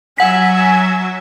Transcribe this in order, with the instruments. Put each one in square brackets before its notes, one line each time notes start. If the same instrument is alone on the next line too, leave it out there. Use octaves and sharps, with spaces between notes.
[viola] F#3 E5 [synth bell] F#5 B6 [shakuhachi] G#5